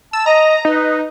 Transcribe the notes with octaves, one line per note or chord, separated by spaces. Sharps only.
A5 E6
D#5 A#5
D#4 B4